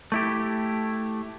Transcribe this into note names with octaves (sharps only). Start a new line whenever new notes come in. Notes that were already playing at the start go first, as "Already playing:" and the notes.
A3 E4 G4